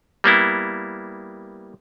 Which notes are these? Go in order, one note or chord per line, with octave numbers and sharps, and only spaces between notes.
G3 A#3 B3 E4